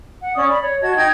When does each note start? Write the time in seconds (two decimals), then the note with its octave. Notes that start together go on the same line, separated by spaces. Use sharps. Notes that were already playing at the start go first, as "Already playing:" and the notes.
0.20 F#5
0.36 C#4 D5 D#6
0.49 D5 B5
0.63 C#5
0.82 F#4 D#5 A5 G#6
0.96 D#4 D#5 G5 G#6